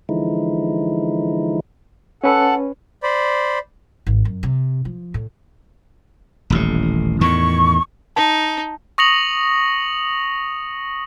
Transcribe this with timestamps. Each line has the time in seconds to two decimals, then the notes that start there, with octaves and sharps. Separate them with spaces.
0.09 D3 E3 F3 G#3 D#4 E4
2.24 C#4 A4 B4 F#5
3.03 C5 D5 B5
4.07 G#1
4.25 F#2
4.43 C3
4.85 F3
5.14 A2
6.50 D#1 A1 A2
7.21 E2 A2 D#3 C#6
8.16 D#4 A5
8.98 C#6 D#6 A#6 C#7 F7 F#7